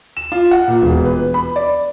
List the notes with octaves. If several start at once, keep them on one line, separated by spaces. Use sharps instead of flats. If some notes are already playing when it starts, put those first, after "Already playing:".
E7
F4
F#5
A#2
E1
B4
B5
D5